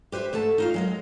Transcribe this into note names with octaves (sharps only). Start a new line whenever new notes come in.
G4 B4 C5 E5
G#2 A3 A4 A5
D#4 F4 F5
F#3 G#3 A#4